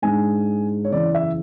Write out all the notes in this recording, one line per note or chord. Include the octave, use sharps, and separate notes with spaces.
G#2 G#3 D4 G#5
C#5
F#1 E2 C#3 E3 D5
E5